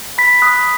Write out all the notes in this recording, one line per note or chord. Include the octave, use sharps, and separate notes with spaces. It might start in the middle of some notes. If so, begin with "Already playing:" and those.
B5 B6
D#6 F#6